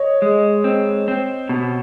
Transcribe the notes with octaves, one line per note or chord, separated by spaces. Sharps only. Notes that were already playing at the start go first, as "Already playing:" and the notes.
Already playing: C#5 D#5
G#3
C4
C4
B2